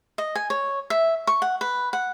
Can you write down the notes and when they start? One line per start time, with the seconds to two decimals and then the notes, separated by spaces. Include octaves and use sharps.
0.18 D#5
0.35 G#5
0.50 C#5
0.90 E5
1.27 C#6
1.42 F#5
1.61 B4
1.93 F#5